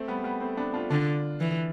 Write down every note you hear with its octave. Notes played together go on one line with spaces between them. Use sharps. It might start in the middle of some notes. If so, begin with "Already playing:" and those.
Already playing: A3 C4
G3 B3
G3 B3
A3 C4
B3 D4
D4 F4
D3 D4 F4
E3